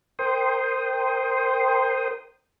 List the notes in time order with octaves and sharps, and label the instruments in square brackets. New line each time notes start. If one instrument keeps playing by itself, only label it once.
[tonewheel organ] A#4 C5 G5 C6 D#6